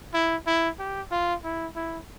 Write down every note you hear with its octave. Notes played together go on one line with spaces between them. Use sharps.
E4
E4
G4
F4
E4
E4